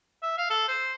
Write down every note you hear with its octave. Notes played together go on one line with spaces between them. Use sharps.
E5
F5
A4
C5